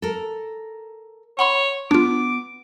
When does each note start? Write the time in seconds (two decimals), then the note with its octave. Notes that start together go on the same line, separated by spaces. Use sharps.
0.02 A4 A#4
1.39 C#5 F#5 B5 C6
1.91 B3 D4 F4 D6